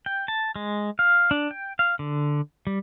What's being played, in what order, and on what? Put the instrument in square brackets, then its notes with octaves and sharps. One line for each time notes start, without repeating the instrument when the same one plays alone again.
[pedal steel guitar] G5
A5
G#3
F5
D4
G5
F5
D3
G3